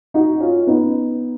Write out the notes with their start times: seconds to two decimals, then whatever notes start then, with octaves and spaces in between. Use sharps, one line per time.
0.14 D#4 F#4
0.40 C#4 F4
0.67 B3 D#4